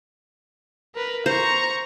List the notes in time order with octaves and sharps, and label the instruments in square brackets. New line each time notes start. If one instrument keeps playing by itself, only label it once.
[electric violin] A#4 B4
[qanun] C5 [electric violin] A#5 C#6